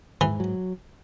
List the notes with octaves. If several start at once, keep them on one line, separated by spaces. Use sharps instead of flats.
G#2 E3
F#3